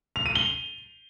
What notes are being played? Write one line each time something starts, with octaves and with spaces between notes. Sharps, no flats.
F7
D#7
G7